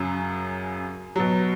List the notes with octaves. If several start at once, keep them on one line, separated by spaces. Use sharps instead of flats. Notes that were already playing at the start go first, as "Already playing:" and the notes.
Already playing: F#2 C#3 F#3
B2 F#3